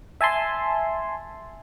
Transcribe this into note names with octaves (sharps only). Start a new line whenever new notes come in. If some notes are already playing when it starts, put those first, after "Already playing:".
E5 G#5 A5 C6